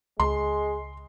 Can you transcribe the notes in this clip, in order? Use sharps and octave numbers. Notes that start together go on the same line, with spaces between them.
C#2 G#3 C6